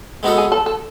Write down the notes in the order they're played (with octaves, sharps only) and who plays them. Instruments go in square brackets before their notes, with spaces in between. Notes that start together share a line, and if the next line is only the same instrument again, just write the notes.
[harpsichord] G#3 B3 D#4 F#4 A4
[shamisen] G#4
A4
A4